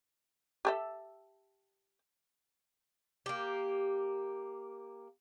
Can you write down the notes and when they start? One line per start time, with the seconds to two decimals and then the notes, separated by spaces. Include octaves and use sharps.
0.65 G4 A4 E5
3.26 A#3 G4